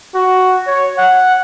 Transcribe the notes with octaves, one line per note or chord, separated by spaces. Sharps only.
F#4
C#5
F#5